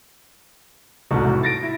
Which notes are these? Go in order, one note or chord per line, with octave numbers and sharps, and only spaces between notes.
E1 C2 G#2 A3 F#4
A2
A6 A#6 D7
E4